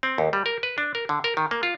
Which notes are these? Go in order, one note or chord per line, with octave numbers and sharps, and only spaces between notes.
C4
D#2
G3
A#4
B4
D4
A#4
D3
A#4
D#3
A#3
F4